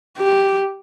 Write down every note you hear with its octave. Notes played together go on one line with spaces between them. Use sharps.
G4